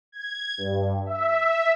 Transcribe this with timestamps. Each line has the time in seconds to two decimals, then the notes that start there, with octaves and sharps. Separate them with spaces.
0.12 G#6
0.58 G2
1.06 E5